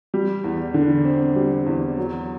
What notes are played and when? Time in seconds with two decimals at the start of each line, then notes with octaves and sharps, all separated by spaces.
0.14 G3
0.44 E2
0.74 D3
1.05 C4
1.36 G3
1.66 E2
1.97 F#3